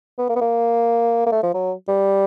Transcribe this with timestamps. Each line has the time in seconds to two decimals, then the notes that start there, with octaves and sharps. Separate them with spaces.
0.18 B3
0.29 A#3
0.36 B3
0.41 A#3
1.26 A#3
1.32 A3
1.43 F3
1.54 F#3
1.88 G3